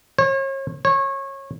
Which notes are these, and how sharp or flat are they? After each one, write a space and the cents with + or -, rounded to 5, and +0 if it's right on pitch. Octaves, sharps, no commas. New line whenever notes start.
C#5 -40
C#5 -25